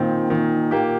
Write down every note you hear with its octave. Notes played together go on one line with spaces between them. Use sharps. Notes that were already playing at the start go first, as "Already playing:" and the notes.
Already playing: A#2 D#3 C4
D#3
A#3 G4